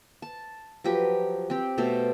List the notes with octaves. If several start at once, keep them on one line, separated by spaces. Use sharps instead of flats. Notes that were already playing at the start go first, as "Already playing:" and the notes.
A5
F3 F#3 G4 B4
C4 G4
B2 A3 A4 C5